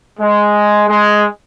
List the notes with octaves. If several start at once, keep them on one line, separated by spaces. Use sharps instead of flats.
G#3
G#3